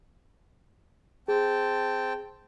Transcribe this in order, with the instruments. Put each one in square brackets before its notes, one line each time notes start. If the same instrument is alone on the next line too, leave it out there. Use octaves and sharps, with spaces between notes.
[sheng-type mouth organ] C4 G5 A5 [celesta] G#4